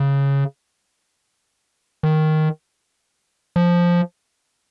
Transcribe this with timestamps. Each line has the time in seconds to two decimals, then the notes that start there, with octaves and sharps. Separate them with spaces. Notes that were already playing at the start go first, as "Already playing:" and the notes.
Already playing: C#3
2.03 D#3
3.56 F3